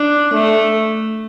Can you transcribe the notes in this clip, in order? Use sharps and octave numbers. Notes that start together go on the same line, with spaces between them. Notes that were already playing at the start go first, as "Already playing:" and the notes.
Already playing: D4
A3